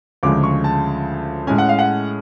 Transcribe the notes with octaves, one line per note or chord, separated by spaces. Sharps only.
D2 C#3 F3 G#3 D6
C#6
A5
A2 G#3 C#4 G#5
F#5
F5
F#5